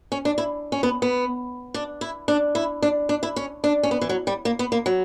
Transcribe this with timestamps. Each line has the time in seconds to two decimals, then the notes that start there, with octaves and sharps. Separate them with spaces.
0.12 C#4
0.25 D4
0.38 E4
0.72 C#4
0.83 B3
1.02 B3
1.74 D4
2.01 E4
2.28 D4
2.55 E4
2.82 D4
3.09 D4
3.23 E4
3.36 C#4
3.64 D4
3.83 C#4
3.91 B3
4.01 E3
4.09 F#3
4.27 G3
4.45 A#3
4.59 B3
4.72 A#3
4.86 F#3